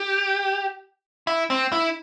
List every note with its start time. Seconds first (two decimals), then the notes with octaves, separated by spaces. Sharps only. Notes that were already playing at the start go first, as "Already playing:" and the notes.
Already playing: G4
1.27 E4
1.50 C4
1.72 E4